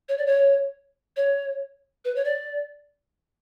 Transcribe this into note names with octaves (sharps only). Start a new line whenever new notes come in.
C#5
D5
C#5
C#5
B4
C#5
D5